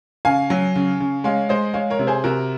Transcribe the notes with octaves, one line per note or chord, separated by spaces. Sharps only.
C#3 F5 G#5
F#3
C#3
C#3
G#3 C#5 F5
G#3 C5 D#5
G#3 C#5 F5
A#4 C#5
C3
G#4 C5
C3 F#4 A#4